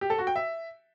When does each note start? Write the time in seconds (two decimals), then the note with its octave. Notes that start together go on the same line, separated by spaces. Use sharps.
0.01 G4
0.10 A4
0.18 F#4
0.27 G5
0.36 E5